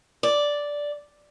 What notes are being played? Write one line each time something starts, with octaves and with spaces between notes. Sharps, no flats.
D5